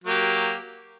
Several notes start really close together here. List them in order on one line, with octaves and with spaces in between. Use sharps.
F#3 A#3 G4